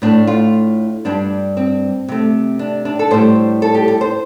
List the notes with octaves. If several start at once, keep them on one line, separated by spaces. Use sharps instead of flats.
A2 A3 D4
F4
G2 G3 D4
C4
C3 A3
D4
D4
A4
A2 G3 C5
A4
G4
A4
C5